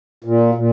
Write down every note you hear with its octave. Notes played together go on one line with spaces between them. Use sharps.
A#2
A#2